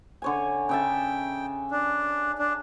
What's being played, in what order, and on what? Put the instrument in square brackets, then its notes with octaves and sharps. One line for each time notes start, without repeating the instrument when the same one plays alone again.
[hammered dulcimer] D3 C#5 G#5
[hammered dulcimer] C#3 E5 A5 [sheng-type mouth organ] G5
[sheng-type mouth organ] D4
D4